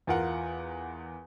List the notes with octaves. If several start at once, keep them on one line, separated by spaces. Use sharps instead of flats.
E2 F4 A#4 F#5